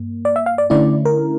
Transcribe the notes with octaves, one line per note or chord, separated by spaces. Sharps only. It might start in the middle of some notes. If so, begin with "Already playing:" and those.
Already playing: G2 A#3
D5
E5
F5
D5
D3 A3 C#4 E4 D5
A#4